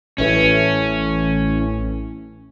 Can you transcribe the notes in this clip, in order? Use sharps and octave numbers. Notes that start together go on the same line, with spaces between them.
A1 E3 A3 C#4